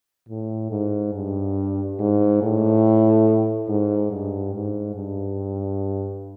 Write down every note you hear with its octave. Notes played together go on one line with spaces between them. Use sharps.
A2
G#2
G2
G#2
A2
G#2
G2
G#2
G2